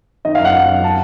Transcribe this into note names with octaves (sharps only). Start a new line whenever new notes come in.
D#3 D#5
F#2 F5
F#5
F#2
F#2
A5